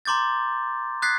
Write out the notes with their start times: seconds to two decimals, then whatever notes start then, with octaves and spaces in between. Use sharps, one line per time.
0.05 A#5 C6 D6 G6 A6
1.02 D#6 F#6 G#6 A6 B6 C7